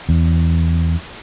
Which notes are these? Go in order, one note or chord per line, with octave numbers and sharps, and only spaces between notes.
E2